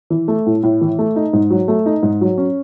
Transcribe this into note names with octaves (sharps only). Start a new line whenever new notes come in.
E3
A3
A2
A2
E3
A3
D#4
G#2
F#3
A3
D#4
G#2
F#3
C#4